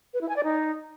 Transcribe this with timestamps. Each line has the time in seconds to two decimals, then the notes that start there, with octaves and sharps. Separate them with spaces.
0.14 B4
0.21 E4
0.29 G#5
0.36 D5
0.44 D#4